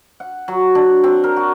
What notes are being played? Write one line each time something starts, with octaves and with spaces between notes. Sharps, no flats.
F#5
F#3
D4
C4
A#4
F#4